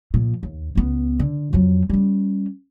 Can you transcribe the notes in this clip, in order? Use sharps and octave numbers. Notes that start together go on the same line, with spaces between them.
A#2 F3
D#2
C#2 B3
D3
F2 F#3
G3 C#4